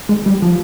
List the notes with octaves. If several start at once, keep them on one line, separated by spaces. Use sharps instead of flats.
G#3
G3
F3